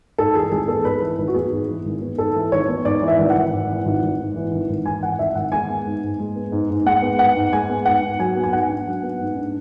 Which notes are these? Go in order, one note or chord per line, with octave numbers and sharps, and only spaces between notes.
G#2 A4
E3 G#4
G#1 G#4
B3 A4
G#2 B4
E3
G#1 B4
F#4
B3 G#4
G#2
E3
G#1
B3
G#2 A4
E3
G#1 C#5
B3
G#2 D5
E3
E5
G#1
F#5
G#1
G#2
E3
G#1
G#1
G#2
E3
G#1
G#1
G#2 G#5
E3 F#5
G#1 E5
G#1 F#5
G#3 G#5
B3
G#2
G#2
G#3
B3
G#2
G#2
G#3 F#5
B3
G#2 F#5
G#2
G#3 G#5
B3
G#2 F#5
G#2
F#3 G#5
B3
G#5
G#2 F#5
D4
F#3
B3
G#2
D4